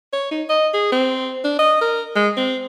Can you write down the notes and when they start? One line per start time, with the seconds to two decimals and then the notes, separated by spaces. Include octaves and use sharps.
0.13 C#5
0.31 D#4
0.50 D#5
0.74 G#4
0.92 C4
1.44 D4
1.59 D#5
1.81 A#4
2.16 G#3
2.37 C4